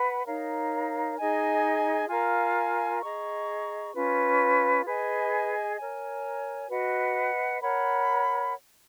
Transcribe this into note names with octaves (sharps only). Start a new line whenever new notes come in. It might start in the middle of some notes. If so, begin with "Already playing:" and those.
Already playing: B4 F#5 B5
D#4 A#4 C#5 F5
D#4 G#4 D#5 G#5
F4 A#4 F5 G#5
G#4 D#5 A#5 C#6
C#4 F4 B4
G#4 B4 D#5 G#5
A#4 C#5 G#5
F#4 B4 D#5 F#5
A#4 C#5 F#5 B5